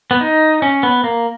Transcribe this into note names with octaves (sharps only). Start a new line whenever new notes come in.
B3
D#4
C#4
B3
A#3